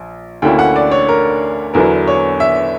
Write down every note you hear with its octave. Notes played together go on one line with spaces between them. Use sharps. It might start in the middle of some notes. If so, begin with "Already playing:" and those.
Already playing: A#1
D2 D3 A#3 C#4 E4 G5
F#5
D5
C#5
A#4
E2 D3 F#3 B3 E4 A#4
C#5
E5